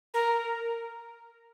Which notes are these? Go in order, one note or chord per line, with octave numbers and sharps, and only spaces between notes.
A#4